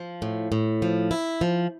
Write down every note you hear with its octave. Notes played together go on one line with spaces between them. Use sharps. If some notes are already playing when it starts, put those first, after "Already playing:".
Already playing: F3
A2
A2
F3
E4
F3